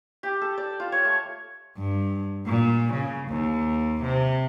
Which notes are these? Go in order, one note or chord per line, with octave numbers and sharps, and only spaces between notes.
G4
A4
D5
F4
C#5
A3
G2
A#2
C#3
D#2
C3